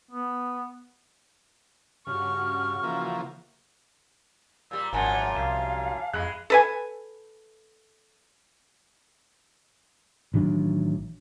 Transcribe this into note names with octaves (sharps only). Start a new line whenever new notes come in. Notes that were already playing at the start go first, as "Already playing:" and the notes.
B3
G2 C#3 F#4 C#6 F6
E3 F3 A#3
A#2 G3 E6
G#1 F#2 A#2 F3 F#5 G#5 A5
C2 F5
F2 G#3 B5 F#6
A4 B4 G#5
A1 D#3 F#3 D4